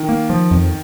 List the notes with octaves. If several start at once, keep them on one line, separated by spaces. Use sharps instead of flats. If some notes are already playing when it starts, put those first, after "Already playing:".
Already playing: D#3
A#3
F3
F2